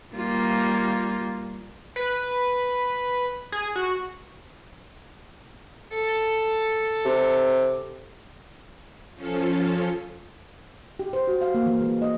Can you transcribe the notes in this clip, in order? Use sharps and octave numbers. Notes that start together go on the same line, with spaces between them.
G3 A#3 F4
B4
G#4
F#4
A4
C3
F3 C#4 F4 A4
G4
C5
F#4
F5
A#3
E3
G#3
D#5